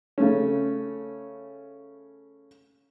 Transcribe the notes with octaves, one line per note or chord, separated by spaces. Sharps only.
C#3 A3 C#4